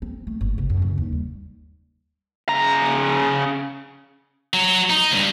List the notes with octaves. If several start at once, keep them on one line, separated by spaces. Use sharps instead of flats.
C4
A3
G1
C3
F#2
C#2
D#2
G3
C#3 A#5
F#3
D#4
C#2 G2